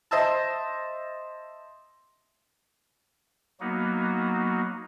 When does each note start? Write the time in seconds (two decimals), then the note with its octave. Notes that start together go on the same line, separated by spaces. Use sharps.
0.11 C5 D#5 E5 A5
3.60 F#3 A#3 B3 D#4 F#4